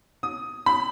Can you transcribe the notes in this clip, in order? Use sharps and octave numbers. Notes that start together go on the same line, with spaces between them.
D#6
B5